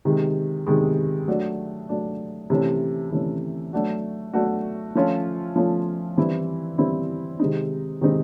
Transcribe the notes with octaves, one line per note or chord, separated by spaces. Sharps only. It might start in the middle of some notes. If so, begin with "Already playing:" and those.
C3 D#3 G#3
C3 D#3 G#3
F#3 A3 D4
F#3 A3 D4
C3 E3 A3 C#4
C3 E3 A3 C#4
F#3 A3 D4 F#4
F#3 A3 D4 F#4
F3 A3 C#4 F4
F3 A3 C#4 F4
E3 G3 C4 E4
E3 G3 C4 E4
C3 D#3 G#3 C4 D#4
C3 D#3 G#3 C4 D#4